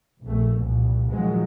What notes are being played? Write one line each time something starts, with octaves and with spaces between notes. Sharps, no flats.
F1 A#1 A3
C2 A#2
A#2 D#3 F3 F#3 G#3